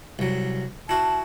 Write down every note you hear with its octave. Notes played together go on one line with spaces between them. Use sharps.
C2 F#3
E4 F#4 A5